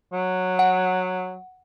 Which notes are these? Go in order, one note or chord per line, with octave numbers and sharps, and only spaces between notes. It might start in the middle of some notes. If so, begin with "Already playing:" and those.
F#3
F#5